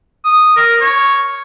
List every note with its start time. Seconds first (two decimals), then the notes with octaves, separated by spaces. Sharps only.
0.25 D#6
0.56 A#4
0.81 C#5